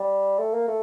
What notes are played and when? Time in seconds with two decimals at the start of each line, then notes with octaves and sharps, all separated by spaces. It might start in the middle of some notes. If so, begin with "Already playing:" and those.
Already playing: G3
0.38 A3
0.54 A#3
0.68 A3